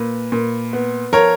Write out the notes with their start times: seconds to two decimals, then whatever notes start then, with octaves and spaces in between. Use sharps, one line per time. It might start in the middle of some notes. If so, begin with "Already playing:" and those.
Already playing: A#2 B4
0.32 A#2
0.73 B3
1.12 F3 A#4 C#5